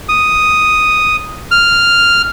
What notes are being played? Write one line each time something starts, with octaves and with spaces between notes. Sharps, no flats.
D#6
F6